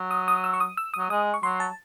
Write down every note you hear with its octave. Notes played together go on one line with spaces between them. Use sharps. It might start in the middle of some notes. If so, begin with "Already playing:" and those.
Already playing: F#3
D#6
D#6
E6
C#6
D#6
E6
F#3 D#6
G#3 D#6
C#6
F#3 C6
A5